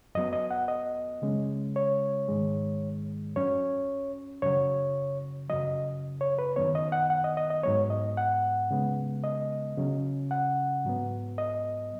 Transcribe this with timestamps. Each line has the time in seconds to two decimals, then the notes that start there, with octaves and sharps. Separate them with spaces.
0.15 F#2 F#3 B3 D#5
0.33 D#5
0.51 F#5
0.68 D#5
1.22 C#3 G#3 C#4
1.76 C#5
2.28 G#2 D#3 G#3
3.36 F#2 F#3 C#4 C#5
4.42 F#2 C#3 F#3 C#5
5.50 F#2 C#3 F#3 D#5
6.21 C#5
6.39 B4
6.56 F#2 D#3 B3 C#5
6.75 D#5
6.92 F#5
7.10 F#5
7.24 D#5
7.37 D#5
7.50 D#5
7.63 G#2 F#3 B3 C#5
7.90 D#5
8.17 F#5
8.71 C#3 G#3 B3
9.24 D#5
9.78 C#3 F#3 C#4
10.31 F#5
10.85 G#2 F#3 B3
11.38 D#5